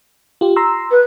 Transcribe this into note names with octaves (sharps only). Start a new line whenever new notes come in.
F4 G4
A#5 C6 E6
B4